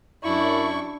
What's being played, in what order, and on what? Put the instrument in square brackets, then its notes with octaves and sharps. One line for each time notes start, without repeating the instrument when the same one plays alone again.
[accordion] F#2 C#6 [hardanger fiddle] D4 E4